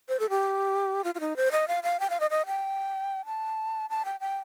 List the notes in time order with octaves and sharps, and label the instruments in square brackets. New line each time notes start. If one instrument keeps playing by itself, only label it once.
[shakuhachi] C5
A4
G4
F4
F4
D#4
C5
D#5
F5
F5
G5
F5
D#5
D#5
G5
A5
A5
G5
G5